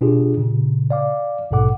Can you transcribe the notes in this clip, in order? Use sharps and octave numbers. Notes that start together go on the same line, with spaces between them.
B2 D4 F4 G4 G#4
A#2 C#3
D5 F5 D6
A#1 G#2 B2 A4 F#5 D6